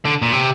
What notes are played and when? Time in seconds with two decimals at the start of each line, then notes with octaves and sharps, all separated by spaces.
0.05 D3
0.22 A#2
0.32 C3